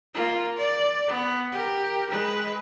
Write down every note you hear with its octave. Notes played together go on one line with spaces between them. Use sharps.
A#3 F4
D5
B3
G4 A#4
G#3 B4